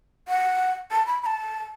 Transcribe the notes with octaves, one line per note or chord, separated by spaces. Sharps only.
F#5
A5
B5
B5
A5